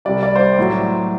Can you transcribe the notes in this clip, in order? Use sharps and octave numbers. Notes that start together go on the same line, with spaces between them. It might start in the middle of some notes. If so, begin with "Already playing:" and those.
C2 C3 G3 D5
D5
C5
D5
A2 F#3